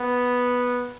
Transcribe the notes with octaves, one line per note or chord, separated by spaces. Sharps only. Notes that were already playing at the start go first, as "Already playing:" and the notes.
Already playing: B3